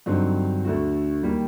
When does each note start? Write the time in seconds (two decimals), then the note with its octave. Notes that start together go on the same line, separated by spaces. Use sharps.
0.06 G2 D3 F#3 C4 D#4
0.65 D2 D3 A3 D4 F#4
1.23 D#2 D#3 G3